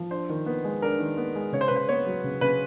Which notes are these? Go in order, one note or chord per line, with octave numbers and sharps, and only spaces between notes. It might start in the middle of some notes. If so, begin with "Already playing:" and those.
Already playing: F3
D4 C5
D#3
B3
G#3
D4 A#4
D#3
B3
G#3
C#3 C#5
C5
B4
C#3 C5
B3 C#5
F#3
C#3
C#3 B4